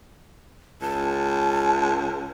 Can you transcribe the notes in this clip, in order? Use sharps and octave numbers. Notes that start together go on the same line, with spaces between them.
C#2 A5